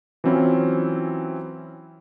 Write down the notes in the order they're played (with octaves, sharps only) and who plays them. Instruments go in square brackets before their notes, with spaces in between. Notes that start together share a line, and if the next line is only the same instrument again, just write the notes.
[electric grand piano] E3 F#3 C4 C#4 E4 F4